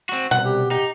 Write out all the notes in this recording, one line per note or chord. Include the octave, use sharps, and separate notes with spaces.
C4 F#4
C2 B2 F#5
G4
D#4 G4